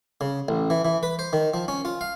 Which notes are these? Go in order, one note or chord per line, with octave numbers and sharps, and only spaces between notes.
C#3
A1
E3
E3
B4
C5
D#3
F3
C#4
F4
F5